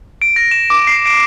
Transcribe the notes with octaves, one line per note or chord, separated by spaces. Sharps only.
D7
A#6
E7
D6
C7
D7